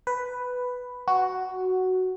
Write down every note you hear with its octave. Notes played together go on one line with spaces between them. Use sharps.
B4
F#4